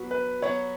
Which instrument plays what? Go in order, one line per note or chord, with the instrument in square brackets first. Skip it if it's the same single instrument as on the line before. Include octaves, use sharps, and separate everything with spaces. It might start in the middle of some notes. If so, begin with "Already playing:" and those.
Already playing: [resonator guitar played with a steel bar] F#3 B3 F#4
[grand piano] B4
[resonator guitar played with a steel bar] F#3 B3 F#4 [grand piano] C#5